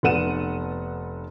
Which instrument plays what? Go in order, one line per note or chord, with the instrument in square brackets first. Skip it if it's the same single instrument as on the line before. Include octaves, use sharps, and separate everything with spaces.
[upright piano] F1 B3 A4 F#5 D#7 E7